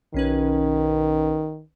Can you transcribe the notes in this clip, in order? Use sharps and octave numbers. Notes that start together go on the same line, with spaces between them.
B1 D#3 C#4 B4